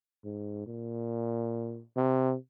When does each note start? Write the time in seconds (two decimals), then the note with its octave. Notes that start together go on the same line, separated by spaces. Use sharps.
0.24 G#2
0.67 A#2
1.96 C3